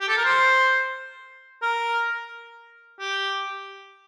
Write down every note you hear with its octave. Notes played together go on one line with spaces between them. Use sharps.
G4
A4
A#4
C5
A#4
G4